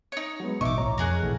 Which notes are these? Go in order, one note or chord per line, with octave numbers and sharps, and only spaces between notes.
D#4 C#5
F#3 G#3 B3
A1 B2 D#4 D#5 E5 C#6 D6
B1 A2 C#5 A#5
F2 F#4 G#4 A#4
A#1 A2 C3 E3 A3